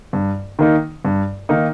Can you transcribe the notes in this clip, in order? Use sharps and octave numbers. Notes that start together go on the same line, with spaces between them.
G2
D#3 A#3 D#4
G2
D#3 A#3 D#4